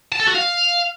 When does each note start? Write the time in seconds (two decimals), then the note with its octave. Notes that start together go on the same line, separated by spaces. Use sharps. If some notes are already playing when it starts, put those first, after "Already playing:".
0.12 A5
0.20 A4
0.27 F#4
0.35 F5